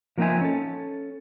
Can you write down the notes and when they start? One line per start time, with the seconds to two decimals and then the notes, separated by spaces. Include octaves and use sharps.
0.18 F3 A#3 C4 D#4 E5 G#5
0.41 C#4 A4